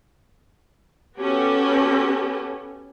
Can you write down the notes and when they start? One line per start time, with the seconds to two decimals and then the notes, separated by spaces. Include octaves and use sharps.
1.19 B3 C#4 F#4 G4 A4